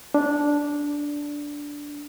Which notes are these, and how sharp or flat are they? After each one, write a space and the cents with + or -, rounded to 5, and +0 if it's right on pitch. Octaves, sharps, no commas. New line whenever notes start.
D4 -10